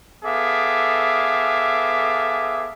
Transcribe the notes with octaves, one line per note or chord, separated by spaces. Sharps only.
B3 G#4 A4 E5 F5 D6